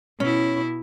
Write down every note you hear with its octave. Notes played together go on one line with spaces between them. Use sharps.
B2 C#4 E4